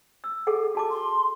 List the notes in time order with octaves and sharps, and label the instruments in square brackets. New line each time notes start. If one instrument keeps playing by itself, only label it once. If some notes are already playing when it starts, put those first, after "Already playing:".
[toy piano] E6
G#4 A4 F#5
F#4 A5 D6
[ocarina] C6